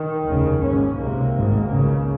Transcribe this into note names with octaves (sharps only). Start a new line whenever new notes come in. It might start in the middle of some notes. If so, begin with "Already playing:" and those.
Already playing: D#3
F1 D#2 C#3
G#1 G#2 C#4
C#2 C3 A#3
G#1 G#2
C#2 C#3